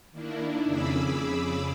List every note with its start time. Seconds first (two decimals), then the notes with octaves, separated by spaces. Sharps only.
0.12 D#3 A#3 D4 E4
0.64 F2 C#3 G#4 B5 D6 E6